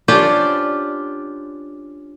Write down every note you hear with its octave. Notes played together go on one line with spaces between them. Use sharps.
C#4 D4 F4 G4 C5 D5